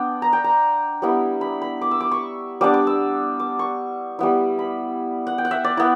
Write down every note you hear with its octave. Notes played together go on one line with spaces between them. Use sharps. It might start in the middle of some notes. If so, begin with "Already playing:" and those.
Already playing: B3 D4 G5
A#5
G5
A#5
G3 B3 E4
B5
B5
D6
E6
D6
C#6
G3 B3 D4 D6
D6
E6
D6
C#6
G3 B3 E4
B5
F#5
G5
F#5
E5
D5
B3 E4